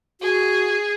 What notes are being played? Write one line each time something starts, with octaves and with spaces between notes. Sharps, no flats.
F#4 G#4